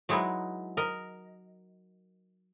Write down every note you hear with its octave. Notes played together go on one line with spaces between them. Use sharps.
F#3 G#3 D#4 E4 B4
A#4 D#5